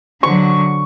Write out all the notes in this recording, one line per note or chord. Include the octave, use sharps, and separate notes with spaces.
D3 F#3 C#6